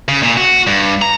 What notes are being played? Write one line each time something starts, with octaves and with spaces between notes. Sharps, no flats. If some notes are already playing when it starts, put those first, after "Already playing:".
C#3
A#2
F#4
G2
A#5